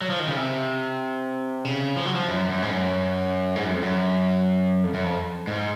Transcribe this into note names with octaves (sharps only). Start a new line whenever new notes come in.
F#3
F3
D#3
C#3
C3
C#3
F3
F#3
F3
F#2
F#2
G#2
F#2
G#2
F#2
F2
F#2
F2
F#2
F2
G#2